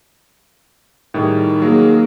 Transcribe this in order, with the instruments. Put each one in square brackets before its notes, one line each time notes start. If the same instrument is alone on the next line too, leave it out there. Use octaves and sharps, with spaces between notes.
[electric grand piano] A2 G3 G#4 [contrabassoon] D#3
[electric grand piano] F#3 [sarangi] A#3 [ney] G#4